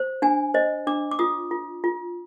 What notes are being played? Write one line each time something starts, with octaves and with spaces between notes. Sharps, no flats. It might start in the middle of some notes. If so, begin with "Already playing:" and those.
Already playing: C5
D4 G#5
C5 D#5
D4 D6
D6
F4 D#6
F4
F4